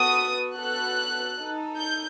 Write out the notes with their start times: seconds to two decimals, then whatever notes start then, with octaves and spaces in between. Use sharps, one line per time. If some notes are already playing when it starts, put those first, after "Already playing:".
Already playing: B3 F#4 A4 D#6
0.56 B3 F#4 A4 F#6
1.38 D#4 A4
1.78 G6